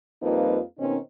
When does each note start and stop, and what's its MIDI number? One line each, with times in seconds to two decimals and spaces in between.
0.22 0.61 41
0.22 0.61 55
0.22 0.61 58
0.22 0.61 63
0.22 0.61 65
0.22 0.61 71
0.78 0.97 47
0.78 0.97 51
0.78 0.97 60
0.78 0.97 61
0.78 0.97 63